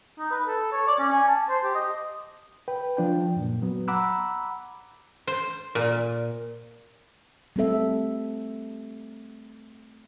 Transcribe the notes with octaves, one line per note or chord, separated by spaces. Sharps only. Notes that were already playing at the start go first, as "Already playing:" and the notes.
D#4
B4
A4
C#5
D5
C#4
G#5
A5
C5
G4
D#5
B4 G5
F3 D4 G5
F#2 A#2
F#3 B3
F#5 A#5 B5 D6 E6 F#6
C5
A#2
G3 A3 C4 A4 E5